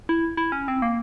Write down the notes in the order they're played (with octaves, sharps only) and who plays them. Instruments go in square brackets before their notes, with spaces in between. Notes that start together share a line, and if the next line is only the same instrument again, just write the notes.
[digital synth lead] E4
E4
C#4
C4
A#3